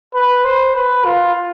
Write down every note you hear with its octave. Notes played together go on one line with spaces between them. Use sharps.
B4
C5
B4
F4